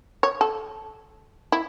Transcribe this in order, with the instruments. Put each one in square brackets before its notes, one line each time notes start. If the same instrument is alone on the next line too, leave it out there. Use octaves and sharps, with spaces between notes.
[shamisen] C#5
A4
E4